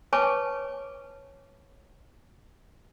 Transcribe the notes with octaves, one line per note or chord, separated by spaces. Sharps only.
B4 C#5 G#5 A5 C#6 D6